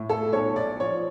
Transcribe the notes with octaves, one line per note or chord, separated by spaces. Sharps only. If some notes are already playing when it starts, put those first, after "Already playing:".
Already playing: A2
A4
B1 C#5
D5
F3 C#5